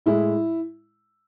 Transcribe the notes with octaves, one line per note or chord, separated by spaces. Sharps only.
A2 G#3 E4